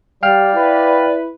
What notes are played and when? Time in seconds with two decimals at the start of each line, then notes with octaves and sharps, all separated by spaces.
0.23 G3 D5 F5 G5 F6
0.54 E4 B4